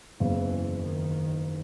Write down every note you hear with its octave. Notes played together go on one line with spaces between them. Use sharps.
F#1 E2 C#3 E3
D#3